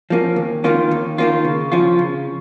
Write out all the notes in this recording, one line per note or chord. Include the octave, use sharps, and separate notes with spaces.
F3 A#3 C#4
D#2
D#3 A#3 C#4 F4
D#2
D#3 A#3 C#4 F4
C#3
F3 C#4 F4
C#3